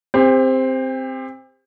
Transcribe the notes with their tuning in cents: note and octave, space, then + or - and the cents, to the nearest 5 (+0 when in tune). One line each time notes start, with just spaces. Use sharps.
C4 +0 G4 +35